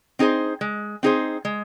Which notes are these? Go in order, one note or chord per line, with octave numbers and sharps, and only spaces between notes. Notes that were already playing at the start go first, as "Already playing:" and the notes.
C4 D#4 G#4 C5
G#3
C4 D#4 G#4 C5
G#3